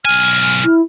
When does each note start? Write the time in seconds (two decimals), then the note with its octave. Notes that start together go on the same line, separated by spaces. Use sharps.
0.05 B1 G#5 F6
0.64 E4